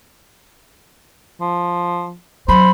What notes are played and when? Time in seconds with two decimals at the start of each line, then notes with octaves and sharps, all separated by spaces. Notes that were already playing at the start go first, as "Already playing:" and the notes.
1.41 F3
2.48 F#3 C5 B5